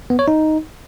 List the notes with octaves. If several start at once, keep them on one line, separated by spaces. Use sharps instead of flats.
B3
C#5
D#4